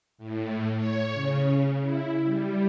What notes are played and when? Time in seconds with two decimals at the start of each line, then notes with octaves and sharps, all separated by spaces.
0.18 A2
0.77 C#5
1.14 C#3
1.81 E4
2.23 G3